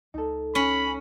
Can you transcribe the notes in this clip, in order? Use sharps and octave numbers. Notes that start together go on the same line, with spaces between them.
C#2 D#4 A4
C#4 B5